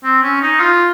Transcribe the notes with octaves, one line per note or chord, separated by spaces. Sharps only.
C4
C#4
D#4
F4